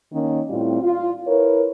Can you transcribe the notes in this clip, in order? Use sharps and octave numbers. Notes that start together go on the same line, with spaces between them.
D#3 A#3 C#4
A2 G3 C4 E4 F4
F4
E4 A#4 B4 C#5